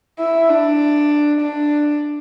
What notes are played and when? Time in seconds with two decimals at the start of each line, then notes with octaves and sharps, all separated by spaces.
0.19 E4
0.49 D4
1.41 D4